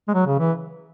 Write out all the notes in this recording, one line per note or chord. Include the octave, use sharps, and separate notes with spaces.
G#3
F#3
C#3
E3